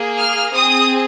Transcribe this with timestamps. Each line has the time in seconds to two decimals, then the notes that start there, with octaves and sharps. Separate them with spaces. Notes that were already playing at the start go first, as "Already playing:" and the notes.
Already playing: A#3 G#4
0.18 F6
0.54 C4 G#4 D#6